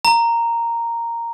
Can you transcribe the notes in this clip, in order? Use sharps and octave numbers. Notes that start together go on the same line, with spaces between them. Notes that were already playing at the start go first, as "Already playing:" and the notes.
A#5